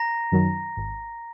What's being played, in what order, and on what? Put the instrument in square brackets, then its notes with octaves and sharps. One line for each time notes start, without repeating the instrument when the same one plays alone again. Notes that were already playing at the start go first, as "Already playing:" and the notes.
Already playing: [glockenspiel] A#5 A#6
[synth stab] F#2 D#3 F#3
G#1